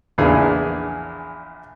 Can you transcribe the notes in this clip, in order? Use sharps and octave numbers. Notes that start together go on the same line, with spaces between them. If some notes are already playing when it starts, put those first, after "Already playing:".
A#1 E2 C#3 D4 E4 G#4